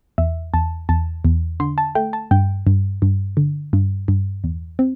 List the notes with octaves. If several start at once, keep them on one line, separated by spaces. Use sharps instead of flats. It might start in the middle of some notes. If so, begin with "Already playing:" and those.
E2 E5
E2 A5
E2 A5
E2
D3 C6
A5
A3 G5
A5
G2 G5
G2
G2
D3
G2
G2
E2
C4